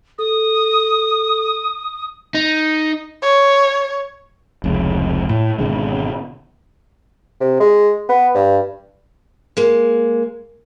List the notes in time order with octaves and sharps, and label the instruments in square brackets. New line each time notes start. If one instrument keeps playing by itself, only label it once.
[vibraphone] A4 [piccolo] D#6
[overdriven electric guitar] D#4
[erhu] C#5
[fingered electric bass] F1 C#2
A2
G#1 B2 D3 G#3
[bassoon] C3
G#3
B3
G2
[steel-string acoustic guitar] G#3 A#3